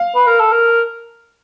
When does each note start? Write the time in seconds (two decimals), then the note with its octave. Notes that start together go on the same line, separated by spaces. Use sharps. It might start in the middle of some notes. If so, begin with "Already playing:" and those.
Already playing: F5
0.15 B4
0.27 A#4
0.40 A4
0.52 A#4